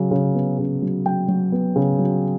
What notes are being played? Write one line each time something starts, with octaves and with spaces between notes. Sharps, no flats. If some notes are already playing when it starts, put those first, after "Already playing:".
Already playing: C#3 F#3
C#3
B3
C#3
F#3
F#3 G5
F#3
B3
C#3
F#3